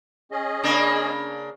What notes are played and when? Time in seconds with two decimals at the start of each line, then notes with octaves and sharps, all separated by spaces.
0.32 C#4 G#4 D#5
0.64 C#3 A#3 D4